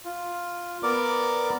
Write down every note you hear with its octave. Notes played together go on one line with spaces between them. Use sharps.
F4
B3 A#4 D5 D6